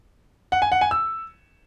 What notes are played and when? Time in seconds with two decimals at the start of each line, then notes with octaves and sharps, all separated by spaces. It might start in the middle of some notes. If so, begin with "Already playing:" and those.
0.52 F#5
0.62 G#5
0.72 F#5
0.81 G#5
0.91 E6